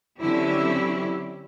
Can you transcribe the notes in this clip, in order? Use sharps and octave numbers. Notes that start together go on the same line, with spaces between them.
D3 F#3 C4 C#4 E4 G4